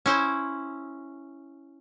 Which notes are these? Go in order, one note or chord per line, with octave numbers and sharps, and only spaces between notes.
C#4 E4 C5